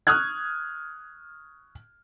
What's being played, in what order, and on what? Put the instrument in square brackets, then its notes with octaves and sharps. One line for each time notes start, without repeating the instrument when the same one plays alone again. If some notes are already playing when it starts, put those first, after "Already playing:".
[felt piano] C#6 D#6 F6 F#6 G#6